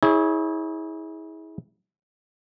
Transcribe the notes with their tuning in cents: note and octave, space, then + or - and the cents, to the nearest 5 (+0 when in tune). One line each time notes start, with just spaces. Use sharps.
E4 -35 G#4 +0 C#5 -5